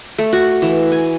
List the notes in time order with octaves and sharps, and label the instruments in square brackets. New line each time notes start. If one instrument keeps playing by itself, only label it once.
[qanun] A3
F#4
E3
G#5